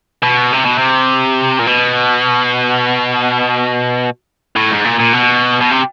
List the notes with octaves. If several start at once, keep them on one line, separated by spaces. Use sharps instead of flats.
B2
C3
B2
C3
A#2
B2
A2
G#2
A#2
A#2
B2
B2
C3